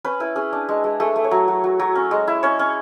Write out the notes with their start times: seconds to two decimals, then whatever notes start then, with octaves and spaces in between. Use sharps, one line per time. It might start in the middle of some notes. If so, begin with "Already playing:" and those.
0.04 C#4 B4
0.20 E4 B4
0.36 C#4 G#4
0.53 D4
0.69 G#3
0.84 G#3
1.00 A3 G#4
1.16 A3
1.24 C#5
1.31 F#3
1.48 F#3
1.64 F#3
1.79 F#3
1.95 C#4
2.11 G#3
2.28 E4
2.43 C#4 C#5
2.59 C#4